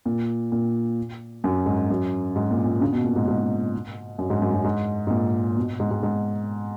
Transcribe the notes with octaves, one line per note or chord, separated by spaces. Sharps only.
A#2
A#2
F#2
G#2
F#2
G#2
A#2
A#2
C#3
B2
A#2
G#2
G#2
F#2
G#2
F#2
F#2
G#2
G#2
A#2
B2
G#2
G#2
G#2